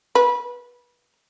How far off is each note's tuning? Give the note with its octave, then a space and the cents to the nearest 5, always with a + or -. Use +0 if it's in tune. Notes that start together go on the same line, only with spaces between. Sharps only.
B4 -25